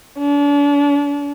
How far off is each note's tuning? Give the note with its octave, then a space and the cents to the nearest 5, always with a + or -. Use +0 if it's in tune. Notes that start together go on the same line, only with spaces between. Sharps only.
D4 -40